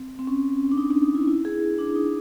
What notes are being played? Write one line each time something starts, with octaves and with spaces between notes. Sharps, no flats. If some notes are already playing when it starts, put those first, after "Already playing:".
Already playing: C4
C4
C#4
D4
D#4
D4
D#4
E4
E4
G#4
D4
D#4